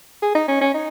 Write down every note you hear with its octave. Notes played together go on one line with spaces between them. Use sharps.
G#4
D#4
C#4
C#4
D#4